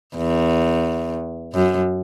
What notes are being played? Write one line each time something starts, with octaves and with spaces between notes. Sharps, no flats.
E2
F#2